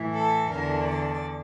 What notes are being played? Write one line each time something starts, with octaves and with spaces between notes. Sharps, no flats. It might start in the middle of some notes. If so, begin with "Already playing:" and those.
Already playing: A2 E3
A4
E2 D3 A#4
D5